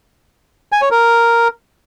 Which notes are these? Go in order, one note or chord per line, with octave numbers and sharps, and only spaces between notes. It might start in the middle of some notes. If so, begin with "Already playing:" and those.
G#5
C#5
A#4